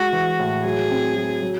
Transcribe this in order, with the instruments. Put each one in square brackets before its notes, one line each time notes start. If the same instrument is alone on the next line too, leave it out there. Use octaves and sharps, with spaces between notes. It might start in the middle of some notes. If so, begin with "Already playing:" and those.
Already playing: [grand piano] G#3 [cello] F#4
[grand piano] E3
A2
[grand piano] F#3 [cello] G#4
[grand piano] C4
F#3
F#3